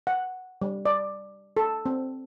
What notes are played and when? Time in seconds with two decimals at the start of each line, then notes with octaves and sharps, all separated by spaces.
0.07 F#5
0.62 G3
0.86 D5
1.57 A4
1.86 C4